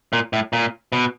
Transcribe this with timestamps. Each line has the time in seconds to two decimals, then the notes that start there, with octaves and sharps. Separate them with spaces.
0.13 A#2
0.33 A2
0.53 A#2
0.92 B2